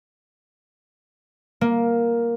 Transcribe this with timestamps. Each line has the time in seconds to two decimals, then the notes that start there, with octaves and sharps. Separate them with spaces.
1.61 A#3